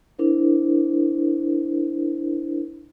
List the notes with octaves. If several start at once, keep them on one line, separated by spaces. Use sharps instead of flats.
D4 E4 A#4 C5